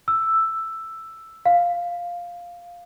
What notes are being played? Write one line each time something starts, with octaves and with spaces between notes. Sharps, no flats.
E6
F5